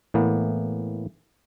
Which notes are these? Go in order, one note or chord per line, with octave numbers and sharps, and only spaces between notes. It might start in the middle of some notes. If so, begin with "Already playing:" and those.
A2 E3 A#3 B3